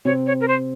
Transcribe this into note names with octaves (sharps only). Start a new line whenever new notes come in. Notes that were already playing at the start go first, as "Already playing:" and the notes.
C3 C4 C#5
C#5
A#4
C5